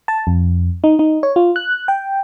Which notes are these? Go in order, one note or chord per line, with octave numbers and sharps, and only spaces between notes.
A5
F2
D#4
D#4
C#5
F4
F#6
G5